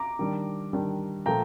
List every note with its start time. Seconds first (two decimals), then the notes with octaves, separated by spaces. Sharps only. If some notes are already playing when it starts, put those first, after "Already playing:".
Already playing: A#5 D6
0.19 D#3 G3 D4
0.73 D#3 G3 D4
1.26 A#2 F3 A3 G5 A#5